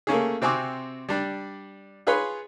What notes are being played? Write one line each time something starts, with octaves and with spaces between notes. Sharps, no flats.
A3 A#3 C#4 G#4
C3 C4 F#4 G#5 D6
G3 D4
F4 G#4 B4 C#5 B5 C6